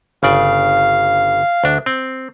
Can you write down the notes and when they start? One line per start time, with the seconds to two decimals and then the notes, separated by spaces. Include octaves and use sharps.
0.23 G1 C#3 D5 F5
1.64 D2 D4
1.86 C4